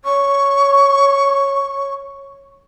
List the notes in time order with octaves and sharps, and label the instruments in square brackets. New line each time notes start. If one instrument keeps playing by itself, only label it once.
[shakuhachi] C#5 [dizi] C#6